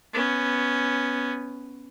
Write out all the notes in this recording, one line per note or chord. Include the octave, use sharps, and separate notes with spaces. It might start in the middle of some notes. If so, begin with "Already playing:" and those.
B3 C#4